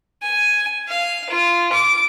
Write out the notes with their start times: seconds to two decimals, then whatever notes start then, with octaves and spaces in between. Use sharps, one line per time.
0.23 G#5
0.88 F5
1.30 F4
1.72 D6